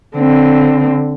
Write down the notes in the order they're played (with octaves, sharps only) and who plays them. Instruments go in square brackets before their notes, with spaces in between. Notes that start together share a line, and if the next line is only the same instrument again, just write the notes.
[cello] D3 C4